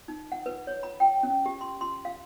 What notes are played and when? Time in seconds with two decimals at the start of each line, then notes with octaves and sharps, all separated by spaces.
0.08 D#4
0.32 F#5
0.46 B4
0.67 C#5
0.83 B5
1.00 G5
1.23 C#4
1.46 G4
1.61 C6
1.81 C6
2.05 F5